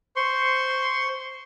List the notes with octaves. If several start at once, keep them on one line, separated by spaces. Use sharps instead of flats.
C5 C6 C#6